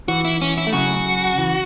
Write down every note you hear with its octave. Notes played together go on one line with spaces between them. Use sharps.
E3 F#4
E4
C#4
E4
A3
C#3 F#3 F#4
E3